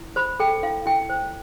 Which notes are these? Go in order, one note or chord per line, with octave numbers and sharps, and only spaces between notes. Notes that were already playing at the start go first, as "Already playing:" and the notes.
Already playing: E4
C5 B5
A4 G5
E4 F5
E4 G5
C5